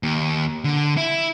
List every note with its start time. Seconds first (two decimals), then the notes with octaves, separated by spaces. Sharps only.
0.03 D#2
0.64 D3
0.97 E4